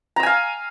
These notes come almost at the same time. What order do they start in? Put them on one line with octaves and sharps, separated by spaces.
A#5 E6 G#5 F5